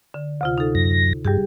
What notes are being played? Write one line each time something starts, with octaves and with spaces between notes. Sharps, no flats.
D3
D2 C3 F4
D#4 A4
F#2 A#6
G2 G3 G4 G#4